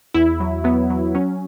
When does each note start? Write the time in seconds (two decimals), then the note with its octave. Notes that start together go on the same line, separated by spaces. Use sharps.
0.14 E2 E4
0.40 F#3
0.64 F#3 B3
0.90 F#3
1.15 F#3 C#4